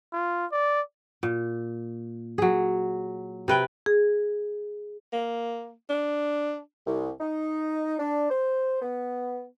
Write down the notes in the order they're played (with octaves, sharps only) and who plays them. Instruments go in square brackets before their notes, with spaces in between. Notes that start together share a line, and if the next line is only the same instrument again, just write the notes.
[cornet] F4
D5
[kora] A#2
F#3 G#4
C3 B4 G5
[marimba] G#4
[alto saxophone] A#3
D4
[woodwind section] C2
D#4
D4
C5
B3